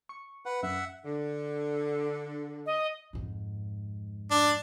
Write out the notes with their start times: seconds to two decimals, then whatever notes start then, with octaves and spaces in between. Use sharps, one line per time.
0.09 C#6 C#7
0.46 B4 F#5
0.63 F#2 E5 F#5
1.04 D3
2.66 D#5
3.13 F2 G#2
4.31 D4